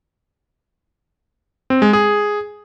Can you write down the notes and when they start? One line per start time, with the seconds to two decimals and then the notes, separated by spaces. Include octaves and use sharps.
1.70 C4
1.82 G#3
1.93 G#4